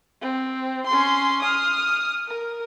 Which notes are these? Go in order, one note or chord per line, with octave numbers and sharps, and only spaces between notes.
C4
C#4 C6
D#6 F6
A#4